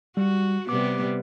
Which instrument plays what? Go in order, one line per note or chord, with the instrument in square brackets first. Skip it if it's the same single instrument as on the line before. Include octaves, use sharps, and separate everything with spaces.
[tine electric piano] G3 [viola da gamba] F#4
[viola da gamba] C3 G3 B3 [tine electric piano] D6